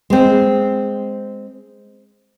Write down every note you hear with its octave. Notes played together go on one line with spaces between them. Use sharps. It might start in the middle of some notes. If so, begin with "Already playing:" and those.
G#3 C4